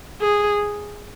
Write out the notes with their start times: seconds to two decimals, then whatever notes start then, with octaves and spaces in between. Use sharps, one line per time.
0.20 G#4